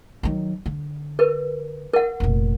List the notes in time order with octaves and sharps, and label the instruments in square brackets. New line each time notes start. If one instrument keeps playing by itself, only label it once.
[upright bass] D#3 F#3
D3
[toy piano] A#4 B4
A#4 F#5
[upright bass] F1 A#2